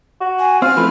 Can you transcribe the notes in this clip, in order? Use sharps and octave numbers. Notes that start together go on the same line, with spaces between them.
F#4
G#5
C4 F4 F6
F3 A3 E4 B4